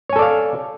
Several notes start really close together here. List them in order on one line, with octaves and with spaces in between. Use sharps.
C#5 G#5 A4 D5 F5